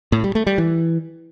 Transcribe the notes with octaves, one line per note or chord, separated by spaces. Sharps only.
A2
G3
A3
G3
E3